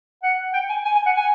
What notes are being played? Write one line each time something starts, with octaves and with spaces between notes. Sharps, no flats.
F#5
G5
G#5
G#5
G#5
F#5
G#5